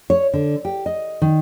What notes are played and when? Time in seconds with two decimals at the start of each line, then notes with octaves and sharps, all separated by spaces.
0.10 C#5
0.34 D3
0.65 G4
0.86 D#5
1.22 D#3